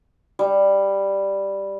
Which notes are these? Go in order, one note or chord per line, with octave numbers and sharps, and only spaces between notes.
G3